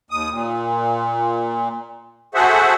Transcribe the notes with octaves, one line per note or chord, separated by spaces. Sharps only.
D#2 D#6
A#2
F#4 G#4 A4 C5 E5 F#5